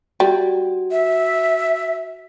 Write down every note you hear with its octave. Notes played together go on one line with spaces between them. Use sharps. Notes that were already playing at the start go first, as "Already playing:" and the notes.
G3 F#4
E5